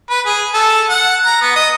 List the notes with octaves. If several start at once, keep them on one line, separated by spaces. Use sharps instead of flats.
B4
G#4
A4
F#5
A#5
B3
D#5